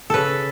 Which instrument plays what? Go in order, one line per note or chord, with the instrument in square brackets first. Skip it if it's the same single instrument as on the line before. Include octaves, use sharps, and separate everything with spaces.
[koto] C#3 A4 B4